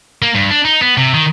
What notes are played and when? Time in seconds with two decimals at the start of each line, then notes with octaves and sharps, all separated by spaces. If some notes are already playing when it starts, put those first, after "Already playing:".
0.22 A#3
0.35 G2
0.51 D4
0.65 D#4
0.82 B3
0.97 C3
1.14 D#3